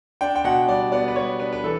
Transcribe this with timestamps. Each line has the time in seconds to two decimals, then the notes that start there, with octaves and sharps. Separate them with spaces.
0.21 D4 G5
0.36 G5
0.44 B2 F#5
0.68 G3 D5
0.92 B3 D5
1.08 B4
1.16 G3 C#5
1.40 D4 B4
1.53 B4
1.64 E3 A4